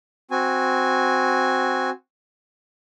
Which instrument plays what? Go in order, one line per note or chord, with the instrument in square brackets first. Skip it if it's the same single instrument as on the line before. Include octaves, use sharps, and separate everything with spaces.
[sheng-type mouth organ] C4 F#4 G#5